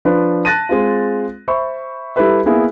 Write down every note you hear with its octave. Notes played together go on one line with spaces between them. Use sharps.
F3 D4 B4
A5 F#6 A6 A#6 D#7
G#3 C4 F4
C5 E5 B5 C#6
G3 E4 G4 A4 B4 E5
A#3 B3 E4 G#4